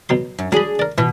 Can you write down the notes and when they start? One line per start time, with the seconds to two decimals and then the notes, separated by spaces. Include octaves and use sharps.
0.09 B2 F#3 C6
0.38 F#2
0.52 F#3 D4 G#4 B5
0.79 A#4 D5
0.98 B2 E3